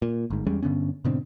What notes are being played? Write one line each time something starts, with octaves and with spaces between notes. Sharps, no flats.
A#2
G1 G#2
E2 G3 G#3 C#4
G2 D3 B3 C#4
G#2 B2 D3 C4